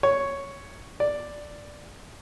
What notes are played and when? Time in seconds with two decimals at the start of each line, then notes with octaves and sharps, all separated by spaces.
0.03 C#5
1.00 D5